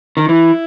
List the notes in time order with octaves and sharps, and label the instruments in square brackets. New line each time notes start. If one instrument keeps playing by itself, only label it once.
[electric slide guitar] D#3
[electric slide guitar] E3 [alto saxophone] E4